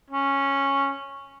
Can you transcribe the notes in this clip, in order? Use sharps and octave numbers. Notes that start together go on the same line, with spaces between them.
C#4